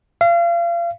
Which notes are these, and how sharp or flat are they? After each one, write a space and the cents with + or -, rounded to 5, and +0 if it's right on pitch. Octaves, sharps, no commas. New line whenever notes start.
F5 -35